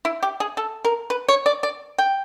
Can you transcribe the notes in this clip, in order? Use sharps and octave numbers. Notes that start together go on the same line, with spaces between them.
E4
G4
G#4
A4
A#4
B4
C#5
D5
D5
G5